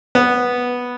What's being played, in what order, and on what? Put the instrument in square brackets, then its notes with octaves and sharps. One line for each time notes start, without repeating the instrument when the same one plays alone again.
[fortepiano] B3